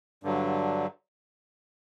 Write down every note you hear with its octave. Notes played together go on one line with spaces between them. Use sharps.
G2 D3 F#3